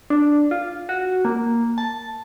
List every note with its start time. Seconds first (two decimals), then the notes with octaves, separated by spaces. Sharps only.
0.10 D4
0.51 F4
0.89 F#4
1.25 A#3
1.78 A5